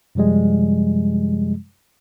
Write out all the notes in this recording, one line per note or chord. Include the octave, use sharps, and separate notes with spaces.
F#2 C3 F3 G3 G#3